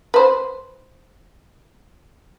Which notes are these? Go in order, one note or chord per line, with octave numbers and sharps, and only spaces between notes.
B4 C5